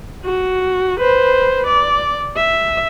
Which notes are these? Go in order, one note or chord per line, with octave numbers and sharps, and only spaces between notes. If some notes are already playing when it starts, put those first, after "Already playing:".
F#4
B4 C5
D5
E5